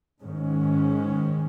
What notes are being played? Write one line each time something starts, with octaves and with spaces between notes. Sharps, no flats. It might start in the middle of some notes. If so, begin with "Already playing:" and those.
G#2 D#3 G#3 C#4